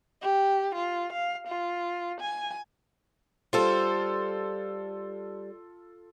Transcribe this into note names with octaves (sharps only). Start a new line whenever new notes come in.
G4
F4
F5
F4
G#5
G3 F4 A4 C5